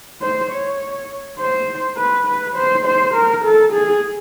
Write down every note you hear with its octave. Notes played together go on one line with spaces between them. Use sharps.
C5
C#5
C5
B4
B4
C5
C5
A#4
A4
G#4